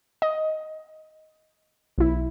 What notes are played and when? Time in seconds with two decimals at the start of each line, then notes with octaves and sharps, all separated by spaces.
0.22 D#5
1.98 B1 E4